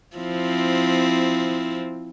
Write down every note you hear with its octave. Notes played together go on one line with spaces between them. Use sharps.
F3 C4 E4